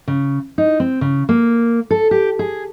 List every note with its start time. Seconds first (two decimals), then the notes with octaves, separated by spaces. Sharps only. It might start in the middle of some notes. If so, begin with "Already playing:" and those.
0.08 C#3
0.58 D#4
0.80 C4
1.01 C#3
1.29 A#3
1.91 A4
2.11 G4
2.39 G#4